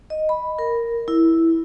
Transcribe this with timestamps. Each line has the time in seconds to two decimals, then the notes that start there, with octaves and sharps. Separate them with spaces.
0.10 D#5
0.29 B5
0.59 A#4
1.08 E4